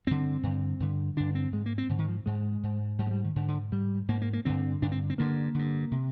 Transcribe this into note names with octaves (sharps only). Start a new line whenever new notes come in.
G2 D3 C4
G2 D3
G2 D3
G2 D3 D4
C4
G#2 G#3
A#3
C4
G#2 D3
D#3
F3
G#2 G#3
G#2
G#2 G3
G#3
G3
D#3
G#2 D3
D3
G#2 G3
G#2 A#3
A#3
A#3
G2 D3 C4
G2 D3 D4
C4
C4
G2 D3 A#3
G2 D3
C3